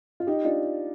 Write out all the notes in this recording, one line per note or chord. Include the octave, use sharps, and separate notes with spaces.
F4
D#4 G4
D4 F4